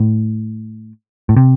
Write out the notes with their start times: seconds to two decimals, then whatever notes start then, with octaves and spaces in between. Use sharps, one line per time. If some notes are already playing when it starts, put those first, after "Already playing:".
Already playing: A2
1.29 A2
1.37 C3